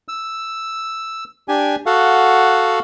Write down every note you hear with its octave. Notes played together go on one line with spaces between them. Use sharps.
E6
D4 G4 G#5
F#4 A4 F5 F#5